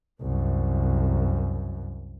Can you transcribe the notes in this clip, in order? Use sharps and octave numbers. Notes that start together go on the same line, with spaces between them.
C2 F#2